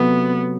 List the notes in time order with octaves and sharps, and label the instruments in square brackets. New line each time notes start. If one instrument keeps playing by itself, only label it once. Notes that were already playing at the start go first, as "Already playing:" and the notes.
Already playing: [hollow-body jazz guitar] C3 F#3 A3 [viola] B3